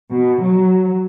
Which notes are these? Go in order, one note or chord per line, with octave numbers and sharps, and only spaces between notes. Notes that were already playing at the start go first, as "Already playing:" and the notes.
B2
F#3